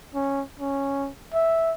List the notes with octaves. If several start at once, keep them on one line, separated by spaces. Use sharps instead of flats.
C#4
C#4
E5